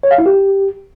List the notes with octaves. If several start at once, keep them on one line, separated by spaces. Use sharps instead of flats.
C#5
F5
E4
G4